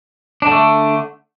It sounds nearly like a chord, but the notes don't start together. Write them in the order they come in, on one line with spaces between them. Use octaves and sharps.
D4 D3 A3